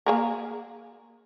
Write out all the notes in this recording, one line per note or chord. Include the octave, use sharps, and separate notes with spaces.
A#3 G#4 A#4